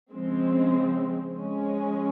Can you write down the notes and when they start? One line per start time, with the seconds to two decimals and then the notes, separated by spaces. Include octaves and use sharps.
0.11 C#3 F3 G#3 C4
1.35 F3 G#3 C#4